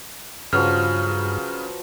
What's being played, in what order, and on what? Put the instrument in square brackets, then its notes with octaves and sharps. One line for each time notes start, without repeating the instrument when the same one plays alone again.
[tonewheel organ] G2 [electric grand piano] C#3 [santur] F3 F#3 B4 [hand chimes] F6